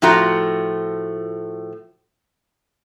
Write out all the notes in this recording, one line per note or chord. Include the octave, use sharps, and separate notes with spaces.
A2 F3 A3 F4 F#4 A#5